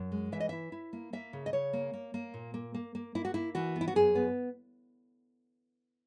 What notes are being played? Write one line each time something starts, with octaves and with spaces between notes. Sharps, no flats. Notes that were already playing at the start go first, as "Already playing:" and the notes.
Already playing: F#2
G#3
E3 E5
D#5
E4 E5
E4
A#3
A#3 E5
C#3
D#5
C#3 C#5
A#3
A#3
A#3
A#2
A#3
A#3
A#3
A#3 E4
F#4
A#3 E4
E3 F#4
B3
E4
F#4
F#2 G#4
B3